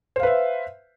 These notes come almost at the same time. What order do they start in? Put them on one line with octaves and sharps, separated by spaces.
C5 F5 B4 E5